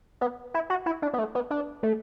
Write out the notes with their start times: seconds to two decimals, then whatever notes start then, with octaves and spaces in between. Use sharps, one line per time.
0.21 B3
0.54 E4
0.70 F#4
0.86 E4
1.02 D4
1.13 B3
1.19 A3
1.35 B3
1.51 D4
1.83 A3